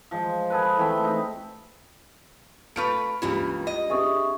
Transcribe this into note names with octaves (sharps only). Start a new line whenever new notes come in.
F3 G#3
G#4 A4 B4
E3 A3 C4 B5
D#4
A3 F4 B4 C#6 F6 D7
C#2 G2 C#3 E3 A#3 F4
D#5
D4 G4 G#4 E5 C#6 D#6